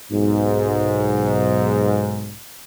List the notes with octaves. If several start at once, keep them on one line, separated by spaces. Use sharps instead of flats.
B1 G#2